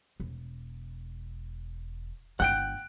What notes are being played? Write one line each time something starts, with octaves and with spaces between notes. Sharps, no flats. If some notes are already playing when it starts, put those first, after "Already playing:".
E1
G1 G#3 F#5 G5 F#6 D7